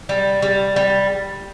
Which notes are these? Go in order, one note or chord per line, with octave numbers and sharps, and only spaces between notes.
G3
G3
G3